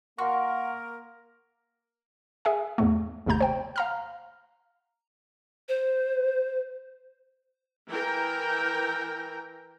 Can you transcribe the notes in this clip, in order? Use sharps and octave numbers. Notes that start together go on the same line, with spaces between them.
A#3 F#4 A#4 F5 C6 C#6
G#4 E5 G#5
E2 G#2 A3
G#1 D#2 C3 A3 A#5 G6
C5 G5
F5 A#5 F6
C5
E3 A#4 G5